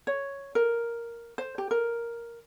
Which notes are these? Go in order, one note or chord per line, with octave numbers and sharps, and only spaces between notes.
C#5
A#4
C5
G4
A#4